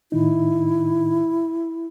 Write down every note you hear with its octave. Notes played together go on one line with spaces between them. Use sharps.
A2 D#3 D#4 E4